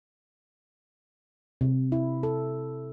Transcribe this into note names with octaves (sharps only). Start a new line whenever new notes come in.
C3
E4
A4